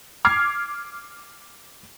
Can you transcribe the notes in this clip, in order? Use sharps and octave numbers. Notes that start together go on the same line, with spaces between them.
D6 F6 G#6 C7